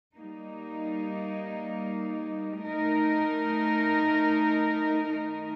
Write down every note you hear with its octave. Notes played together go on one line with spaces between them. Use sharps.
G3 A#3 D#4
A3 D#4 A#4
D#3 A3 D#4 A#4